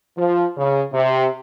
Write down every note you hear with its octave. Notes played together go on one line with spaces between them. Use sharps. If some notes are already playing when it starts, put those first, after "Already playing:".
F3
C#3
C3